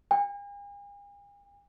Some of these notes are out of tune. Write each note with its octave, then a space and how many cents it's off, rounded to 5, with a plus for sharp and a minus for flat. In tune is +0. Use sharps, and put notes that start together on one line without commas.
G#5 -45